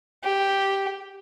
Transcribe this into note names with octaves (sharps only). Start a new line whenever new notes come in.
G4